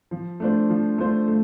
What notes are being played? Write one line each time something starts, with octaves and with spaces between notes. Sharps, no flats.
F3
A3 D4 F4 C5
F3
A3 D4 F4 C5
A3